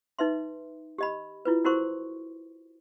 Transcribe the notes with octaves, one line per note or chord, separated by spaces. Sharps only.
D#4 B4 E5 C6
G4 D#5 B5
E4 F4 B4
E4 F#4 A#4 C5 C6 C#6